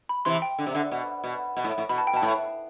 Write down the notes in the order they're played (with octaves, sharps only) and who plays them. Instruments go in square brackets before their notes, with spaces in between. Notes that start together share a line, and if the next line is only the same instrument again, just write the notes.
[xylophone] B5
[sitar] C3 E3 [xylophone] C6
[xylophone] G5
[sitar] D3
C3
D3
B2
B2
B2
A2
A2
[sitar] B2 [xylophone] B5
[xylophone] A5
G5
[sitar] B2 [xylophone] A5
[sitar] A2